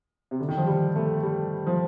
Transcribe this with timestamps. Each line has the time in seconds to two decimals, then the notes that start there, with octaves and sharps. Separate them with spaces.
0.31 C3
0.40 D3
0.49 D#3
0.57 F3
0.67 G3
0.96 A3
1.23 G3
1.67 F3